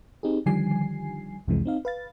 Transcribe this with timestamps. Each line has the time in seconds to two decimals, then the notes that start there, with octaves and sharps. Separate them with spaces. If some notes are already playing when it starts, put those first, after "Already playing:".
0.23 C4 D#4 G4 G#4
0.46 D3 D#3 F3 G3 G#5 C7
1.47 C2 F2 C3 E3 G#3
1.65 C4 D#4 F5
1.85 B4 F5 A6